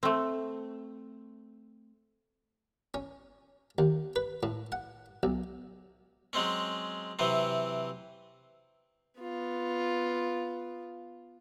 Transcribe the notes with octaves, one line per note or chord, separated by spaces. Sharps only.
A3 C4
C#4
D#2
B4
A2
F#5
B1
F#3 G#3 C4 C#4
C3 E3 F#3 C4
B3 F4